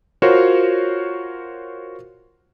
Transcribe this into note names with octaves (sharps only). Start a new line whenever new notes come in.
F4 F#4 A#4 C5 C#5